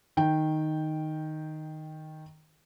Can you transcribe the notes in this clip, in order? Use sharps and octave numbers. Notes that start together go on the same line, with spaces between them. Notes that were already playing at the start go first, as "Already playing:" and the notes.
D#3 G5